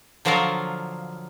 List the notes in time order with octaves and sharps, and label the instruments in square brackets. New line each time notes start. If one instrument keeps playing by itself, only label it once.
[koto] D3 F3 F#3 F4 A#4 F5